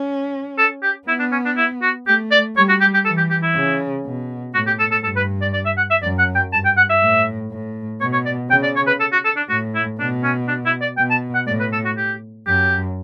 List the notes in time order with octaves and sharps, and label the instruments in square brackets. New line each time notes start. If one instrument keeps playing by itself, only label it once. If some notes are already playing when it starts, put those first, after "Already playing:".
Already playing: [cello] C#4
[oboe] A4
G4
[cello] B3 [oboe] E4
[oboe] D4
C#4
D4
E4
F#4
[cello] A3 [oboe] G4
[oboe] D5
[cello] G3 [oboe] C#5
[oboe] F#4
G4
G4
[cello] E3 [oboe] A4
[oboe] G4
G4
E4
[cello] C#3
B2
[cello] A2 [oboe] F#4
[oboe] G4
A4
A4
[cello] G2 [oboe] A4
[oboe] B4
D5
D5
E5
F#5
E5
[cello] F#2 [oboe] D5
[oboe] F#5
G5
[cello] G2 [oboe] A5
[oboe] G5
F#5
E5
[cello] A2
A2
[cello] B2 [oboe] C#5
[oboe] C#5
D5
[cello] C#3 [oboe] G5
[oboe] D5
C#5
B4
A4
F#4
A4
D4
[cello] A2 [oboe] F#4
[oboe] E4
[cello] B2 [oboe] D4
[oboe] C#4
D4
E4
D5
[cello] B2 [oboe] G5
[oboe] A5
F#5
[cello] A2 [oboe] D5
[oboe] B4
A4
F#4
G4
[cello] F#2 [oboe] G4